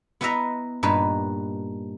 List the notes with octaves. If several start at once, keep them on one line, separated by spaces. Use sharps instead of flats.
B3 E4 B4 D#5 E5 A#5
G2 A#2 D#4 B4